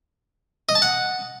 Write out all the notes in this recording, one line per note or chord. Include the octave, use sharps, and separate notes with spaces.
D#5
A5
F#5